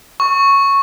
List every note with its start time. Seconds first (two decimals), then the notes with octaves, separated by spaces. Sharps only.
0.20 C#6